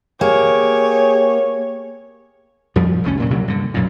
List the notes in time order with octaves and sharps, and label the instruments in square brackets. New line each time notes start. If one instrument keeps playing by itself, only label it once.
[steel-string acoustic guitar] A#3 [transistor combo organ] G4 G#4 [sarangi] C#5
[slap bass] F2 F3 G3
F1 C#2 A3 C#4
D#2 A#2 F#3
C2 C3 F#3
G2 D3
B1 F#2 A#2